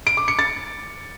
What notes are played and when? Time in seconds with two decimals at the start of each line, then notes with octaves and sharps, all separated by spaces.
0.07 D7
0.17 D6
0.28 C#7
0.39 A6